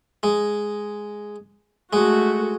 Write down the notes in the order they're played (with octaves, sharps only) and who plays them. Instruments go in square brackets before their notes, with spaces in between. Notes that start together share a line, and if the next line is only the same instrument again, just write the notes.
[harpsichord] G#3
[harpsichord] G#3 [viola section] A3 F#4